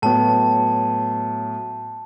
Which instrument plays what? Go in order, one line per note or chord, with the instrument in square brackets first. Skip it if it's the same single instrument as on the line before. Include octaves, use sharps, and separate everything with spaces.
[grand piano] A2 F#3 B3 [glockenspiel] A5